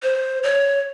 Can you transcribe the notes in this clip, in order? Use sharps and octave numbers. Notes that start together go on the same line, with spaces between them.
C5
C#5